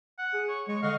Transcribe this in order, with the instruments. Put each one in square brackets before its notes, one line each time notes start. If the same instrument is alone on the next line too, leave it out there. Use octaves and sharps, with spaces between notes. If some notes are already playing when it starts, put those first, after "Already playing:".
[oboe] F#5
[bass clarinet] G#4
[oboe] C#5
[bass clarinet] G#3 [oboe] C#5
[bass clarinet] D3 [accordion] D#5 F#5 C#6 [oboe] F5